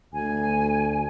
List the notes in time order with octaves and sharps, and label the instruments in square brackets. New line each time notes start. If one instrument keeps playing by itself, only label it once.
[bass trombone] D2 [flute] G#5